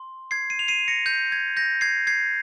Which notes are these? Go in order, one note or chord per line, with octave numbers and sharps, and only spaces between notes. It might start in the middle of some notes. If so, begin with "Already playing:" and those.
Already playing: C6
G#6 C7
C7 D#7
F7
C7 D#7
A#6 C#7
G6
G#6
G6 A#6
G#6 C7
G#6 C7